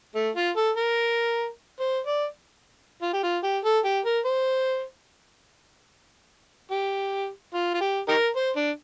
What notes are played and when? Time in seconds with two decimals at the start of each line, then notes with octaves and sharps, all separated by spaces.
0.15 A3
0.36 F4
0.57 A4
0.77 A#4
1.80 C5
2.06 D5
3.02 F4
3.13 G4
3.24 F4
3.44 G4
3.64 A4
3.85 G4
4.05 A#4
4.25 C5
6.71 G4
7.54 F4
7.74 F4
7.81 G4
8.08 D#4 G4 A#4
8.36 C5
8.56 D4